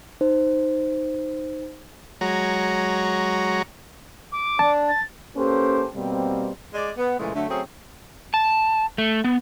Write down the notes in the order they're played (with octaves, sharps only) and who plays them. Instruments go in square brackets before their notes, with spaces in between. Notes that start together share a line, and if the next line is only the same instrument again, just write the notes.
[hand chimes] D#4 C5
[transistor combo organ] F#3 G#3 F#4 C#5 A#5
[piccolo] D6
[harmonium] D4 [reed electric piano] A5
[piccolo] A6
[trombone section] A#3 C#4 G4 A4 B4 C5
B2 G3 A#3 C4
[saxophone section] G#3 D5
B3
A#2 C#3 E3 G#3 A3
D3 F#3 A3
F#3 A3 C4 C#4 G#4
[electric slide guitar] A5
A3
B3